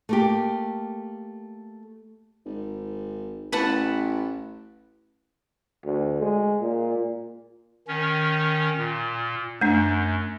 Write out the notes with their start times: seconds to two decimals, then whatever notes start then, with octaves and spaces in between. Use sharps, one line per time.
0.09 A3 A#3 G4
2.45 G#1
3.52 A1 B4 F#5 A5
5.85 D2
6.22 G#3
6.61 A#2
7.88 D#3 C#4
8.78 A#2
9.61 F#2 A3 D4